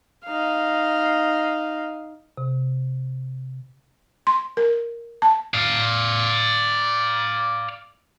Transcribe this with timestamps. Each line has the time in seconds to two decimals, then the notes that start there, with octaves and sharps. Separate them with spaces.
0.25 D#4 F5
2.37 C3
4.27 C6
4.57 A#4
5.22 A5
5.54 D5 F5